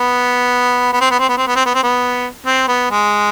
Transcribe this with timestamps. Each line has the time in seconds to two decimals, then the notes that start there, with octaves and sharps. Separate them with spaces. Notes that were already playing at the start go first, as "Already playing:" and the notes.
Already playing: B3
0.92 B3
1.00 C4
1.11 B3
1.19 C4
1.29 B3
1.37 C4
1.47 B3
1.56 C4
1.65 B3
1.74 C4
1.83 B3
2.46 C4
2.68 B3
2.91 G#3